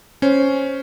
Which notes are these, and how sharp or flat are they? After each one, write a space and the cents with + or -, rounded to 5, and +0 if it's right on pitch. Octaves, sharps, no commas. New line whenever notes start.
C#4 +0 C5 +0